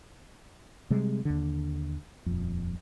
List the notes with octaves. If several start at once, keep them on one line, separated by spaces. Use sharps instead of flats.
C3 G3 G#3
D#2 D3
D#1 F2